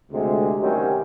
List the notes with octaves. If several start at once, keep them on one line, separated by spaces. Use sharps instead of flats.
D2 C3 G#3
C3 D#3 F#3 G3 C4 C#4